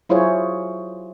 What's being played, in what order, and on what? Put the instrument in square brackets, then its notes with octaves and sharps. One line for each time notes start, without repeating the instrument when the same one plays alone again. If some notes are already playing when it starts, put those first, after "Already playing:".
[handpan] F#3 E4 F4 G#4 C5 C#5